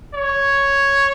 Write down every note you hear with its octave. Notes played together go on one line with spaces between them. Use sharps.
C#5